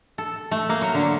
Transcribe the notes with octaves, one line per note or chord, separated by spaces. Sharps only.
A4
A3
A#3
F#3
D3